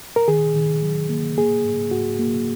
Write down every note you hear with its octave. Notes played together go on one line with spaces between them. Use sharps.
A#4
D#3 G#4
D#3
F#3
A#3
A#3 G#4
G#2
G#2 F#4
A#3